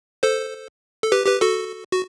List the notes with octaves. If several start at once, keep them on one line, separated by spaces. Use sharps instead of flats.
A4 C5
A4
G4 B4
G4 B4
F#4 A4
F#4